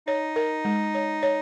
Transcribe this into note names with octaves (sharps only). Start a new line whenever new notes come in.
D#4 C#5
A#4
G#3
C#5
C#5